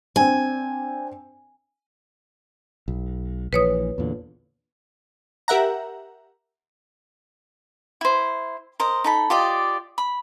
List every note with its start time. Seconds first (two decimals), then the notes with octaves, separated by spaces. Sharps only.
0.16 C4 D4 G#5
2.88 B1
3.53 A#1 E3 B4 C#5 D#6
3.98 E2 A#2 D3
5.48 G4 A#4 E5 F#5 A#5
8.01 E4 C5
8.80 A#4 C5 D#5
9.04 D#4 A4 B5
9.30 F4 G4 D5 D#5
9.98 B5